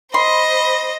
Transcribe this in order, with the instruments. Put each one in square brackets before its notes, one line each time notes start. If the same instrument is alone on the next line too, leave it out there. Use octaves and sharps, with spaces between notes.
[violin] C5 D#5 [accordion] B5 [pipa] C6